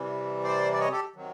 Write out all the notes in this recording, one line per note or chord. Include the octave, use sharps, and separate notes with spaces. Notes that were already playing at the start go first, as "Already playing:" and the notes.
Already playing: C3 E3 G3
C5 D5
D5
C#5 D#5
G4 A4
C3 D#3 F#3